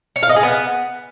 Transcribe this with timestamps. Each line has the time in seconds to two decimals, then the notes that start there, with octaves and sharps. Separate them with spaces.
0.16 C#5
0.23 F5
0.29 D#5
0.36 G#4
0.43 B3